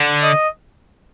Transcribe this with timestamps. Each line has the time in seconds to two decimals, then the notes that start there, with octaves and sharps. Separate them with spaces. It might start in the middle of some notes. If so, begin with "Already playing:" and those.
Already playing: D3
0.23 D#5